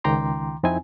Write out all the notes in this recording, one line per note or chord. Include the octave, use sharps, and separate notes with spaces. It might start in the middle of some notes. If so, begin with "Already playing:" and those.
C#2 D#3 G5 A#5 C6 D6
F2 C4 D#4 E4 G#5